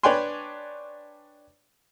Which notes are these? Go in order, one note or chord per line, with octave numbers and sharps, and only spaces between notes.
D4 B4 C#5 G5 G#5 C6